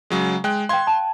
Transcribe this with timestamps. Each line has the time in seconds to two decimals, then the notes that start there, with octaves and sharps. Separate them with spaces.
0.10 C#3 F#3 G#3
0.44 G#3 G5 F#6
0.69 F5 G5 C6 G#6
0.87 A5